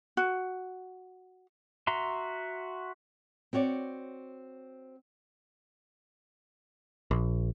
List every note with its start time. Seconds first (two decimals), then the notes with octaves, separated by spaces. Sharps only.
0.17 F#4
1.87 F#4 E5 A#5 C6
3.53 C4 F#4 C#5 D5
7.11 A#1